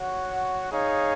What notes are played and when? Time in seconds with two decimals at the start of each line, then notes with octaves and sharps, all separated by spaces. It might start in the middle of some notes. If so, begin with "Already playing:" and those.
Already playing: F#4 C#5 F#5
0.71 D#4 G#4 C#5 F5